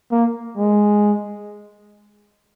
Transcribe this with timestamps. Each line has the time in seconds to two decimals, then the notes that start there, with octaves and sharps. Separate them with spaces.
0.11 A#3
0.58 G#3